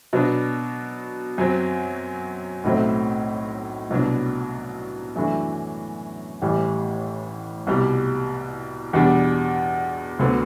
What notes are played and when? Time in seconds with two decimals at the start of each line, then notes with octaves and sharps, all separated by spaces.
0.13 B2 F#3 B3 D4
1.38 F#2 F#3 C4
2.64 B1 A2 F#3 A3 C4
3.90 C2 B2 F#3 B3 D4
5.16 F#2 E3 A3 D4 F#4
6.42 A1 A2 E3 G3
7.67 C2 B2 G3
8.93 E2 B2 G3 D4
10.19 D2 D3 F#3 B3